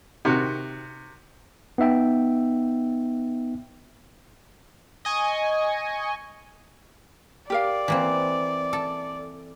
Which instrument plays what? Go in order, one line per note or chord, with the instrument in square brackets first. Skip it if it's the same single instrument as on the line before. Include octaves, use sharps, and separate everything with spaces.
[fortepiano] C3 D#3 F#4
[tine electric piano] B3 D#4 E5 G5
[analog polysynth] D#5 G#5 C#6
[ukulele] G4 A#4 F5 [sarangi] D5
[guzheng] E3 A#3 C4
A4